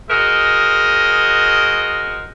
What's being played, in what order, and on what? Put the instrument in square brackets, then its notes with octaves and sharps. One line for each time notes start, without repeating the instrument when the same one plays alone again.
[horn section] F#4 G#4 A#4 C5 D#5